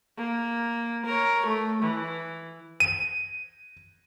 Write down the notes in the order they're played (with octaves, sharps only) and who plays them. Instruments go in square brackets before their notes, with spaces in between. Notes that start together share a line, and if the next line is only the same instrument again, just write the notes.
[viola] A#3
A#4 C#5
A3
E3
[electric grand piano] D#7